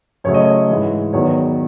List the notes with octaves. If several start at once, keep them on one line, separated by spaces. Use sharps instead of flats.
F#2 C#3 F#3 A3 C#5
D#5
C#5
G#2 E3 G#3
E2 D#3 F#3 B3 C#5